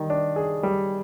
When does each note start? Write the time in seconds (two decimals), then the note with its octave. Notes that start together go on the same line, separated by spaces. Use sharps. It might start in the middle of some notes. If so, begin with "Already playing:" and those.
Already playing: D#3 G3
0.10 D4
0.36 G#4
0.63 G3